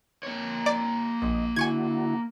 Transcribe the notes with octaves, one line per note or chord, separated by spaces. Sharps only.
A#3 C#5
D5
A#1 D#5
D3 E4 F#4 G#5 C#6 G#6